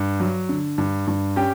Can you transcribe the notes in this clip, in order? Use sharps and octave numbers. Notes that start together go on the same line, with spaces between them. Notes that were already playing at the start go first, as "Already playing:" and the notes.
Already playing: G2
F#3
D3
G2
G2
C#4 G4 G5